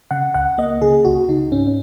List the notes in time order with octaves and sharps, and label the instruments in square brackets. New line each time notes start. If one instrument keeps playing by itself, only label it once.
[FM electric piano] C#3 F#5
C#2 F#5
A#3 D#5
C#3 G#4
C#2 F#4
C#3 D#4
G#2 C#4
C#4